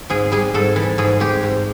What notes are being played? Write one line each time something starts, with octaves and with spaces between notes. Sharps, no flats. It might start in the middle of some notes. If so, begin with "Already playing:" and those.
G#2 G#4
G3 G#4
G#2 A4
E3
G#2 G#4
G#3 G4
G#2